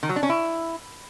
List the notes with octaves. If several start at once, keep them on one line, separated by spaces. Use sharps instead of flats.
D#3
F#3
D4
C#4
E4